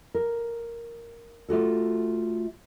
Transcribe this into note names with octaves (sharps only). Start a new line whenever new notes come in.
A#4
A3 F4 F#4 A4